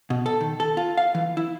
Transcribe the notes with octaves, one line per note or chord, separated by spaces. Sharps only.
B2
A4
D#3
A4
F4
F5
E3
E4